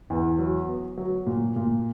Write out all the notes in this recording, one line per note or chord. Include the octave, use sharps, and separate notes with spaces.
E2
F#3
B3
F#3
A#2
A#2